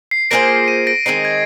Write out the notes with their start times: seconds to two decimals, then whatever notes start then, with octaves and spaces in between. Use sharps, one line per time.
0.11 C7
0.31 A#3 F4 G#4 C5 A#6 D7
0.68 C7 D#7
0.87 A#6 D7
1.06 D#3 G#3 C4 D#4 C7
1.25 G#6